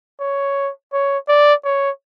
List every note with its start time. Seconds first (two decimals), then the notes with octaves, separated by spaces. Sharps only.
0.20 C#5
0.93 C#5
1.29 D5
1.65 C#5